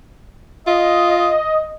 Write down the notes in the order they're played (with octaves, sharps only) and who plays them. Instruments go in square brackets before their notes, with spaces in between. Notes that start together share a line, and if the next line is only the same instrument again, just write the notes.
[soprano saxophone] F4 [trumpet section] D#5